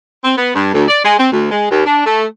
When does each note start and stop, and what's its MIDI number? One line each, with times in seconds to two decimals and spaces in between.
0.24 0.35 60
0.37 0.53 59
0.55 0.71 43
0.74 0.86 38
0.88 1.02 74
1.04 1.16 56
1.19 1.27 60
1.32 1.51 38
1.51 1.69 56
1.70 1.85 39
1.85 2.05 62
2.06 2.25 57